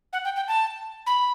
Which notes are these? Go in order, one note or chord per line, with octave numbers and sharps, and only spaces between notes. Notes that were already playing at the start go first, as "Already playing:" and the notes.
F#5
G5
G5
A5
B5